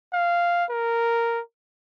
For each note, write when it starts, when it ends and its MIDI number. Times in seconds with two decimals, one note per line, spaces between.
0.13 0.65 77
0.70 1.40 70